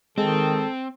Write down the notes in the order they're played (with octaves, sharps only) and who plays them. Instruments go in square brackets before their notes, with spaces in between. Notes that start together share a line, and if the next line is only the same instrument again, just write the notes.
[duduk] D#3 [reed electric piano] G#3 [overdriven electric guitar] C4 [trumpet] A4